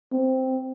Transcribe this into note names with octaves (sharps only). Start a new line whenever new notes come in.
C4